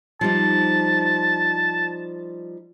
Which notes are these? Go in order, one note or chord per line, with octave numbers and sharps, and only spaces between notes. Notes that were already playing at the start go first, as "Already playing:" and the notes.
F3 G3 D#4 A5